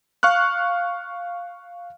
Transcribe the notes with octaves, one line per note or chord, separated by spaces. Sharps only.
F5 C#6 F6 F#6